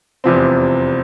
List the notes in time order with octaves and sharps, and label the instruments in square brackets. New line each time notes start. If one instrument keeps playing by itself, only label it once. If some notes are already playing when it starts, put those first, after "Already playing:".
[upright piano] F1 E2 C3 F3 C4